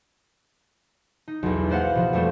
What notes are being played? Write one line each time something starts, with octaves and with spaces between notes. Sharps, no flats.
D#4
B1 E2
A#3 B3 C5 F5 F#5
B2 F3
F2 G3 A3 C5